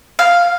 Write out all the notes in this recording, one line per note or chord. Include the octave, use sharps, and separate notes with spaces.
F5